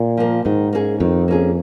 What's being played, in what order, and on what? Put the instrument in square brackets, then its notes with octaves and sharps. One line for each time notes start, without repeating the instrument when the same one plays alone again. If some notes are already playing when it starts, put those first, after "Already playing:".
Already playing: [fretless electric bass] A#2
[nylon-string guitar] F3 A#3
[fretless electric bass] G#2 [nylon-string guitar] D#3
[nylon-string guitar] A#3 C#4 G#4
[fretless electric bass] F2 [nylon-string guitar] D#3
[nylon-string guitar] A#3 C#4 G#4